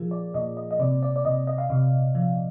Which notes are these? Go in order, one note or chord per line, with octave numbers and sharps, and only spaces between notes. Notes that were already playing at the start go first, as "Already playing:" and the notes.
Already playing: A#2 F3 F4 G#4 A#4
D5
A#2 D#5
D#5
D#5
C3 D5
D5
D5
C3 D#5
D#5
F5
C3 D#5
F3